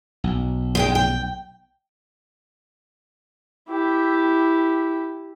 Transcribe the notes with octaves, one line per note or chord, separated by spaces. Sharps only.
B1
G#2 G#3 G5
G5
E4 G4